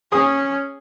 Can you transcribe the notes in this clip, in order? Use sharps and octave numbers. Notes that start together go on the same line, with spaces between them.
C#4 G#4 D#6